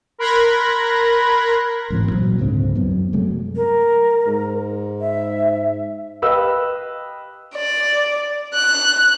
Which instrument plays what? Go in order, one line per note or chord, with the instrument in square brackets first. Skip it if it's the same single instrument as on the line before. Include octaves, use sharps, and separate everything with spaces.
[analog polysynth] A#4 B5 C6 F#6 G#6 A#6
[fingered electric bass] A1 G#2 E3 C4
A#2 F#3
C#2 G#2 D3 C4
F#2 F#3 B3
C3 F#3 G#3 A3
[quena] A#4
[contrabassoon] G#2
[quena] E5
[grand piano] G4 B4 D#5 F5 E6
[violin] D5
F#6